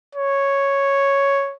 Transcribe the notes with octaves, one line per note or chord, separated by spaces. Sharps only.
C#5